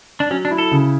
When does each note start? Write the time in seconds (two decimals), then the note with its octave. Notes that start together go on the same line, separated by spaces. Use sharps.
0.20 D4
0.30 F#3 C#4
0.45 D4
0.51 E4
0.58 A4
0.71 C#3